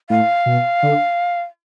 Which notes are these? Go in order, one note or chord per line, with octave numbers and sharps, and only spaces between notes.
A2 F5
B2
D3